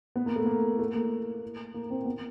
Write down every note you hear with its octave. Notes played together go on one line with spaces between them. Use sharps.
B3
A#3
A3
A#3
A3
A#3
A#3
C4
B3